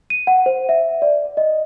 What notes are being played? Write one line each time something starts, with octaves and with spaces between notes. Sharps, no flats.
D#7
F#5
C5
E5
D5
D#5